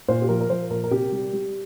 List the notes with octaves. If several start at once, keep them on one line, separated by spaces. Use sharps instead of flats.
A#2 C5
G4
F3 A#4
A#4
F3 C5
A#2 A#4
A#4
C3 G4
G3
G3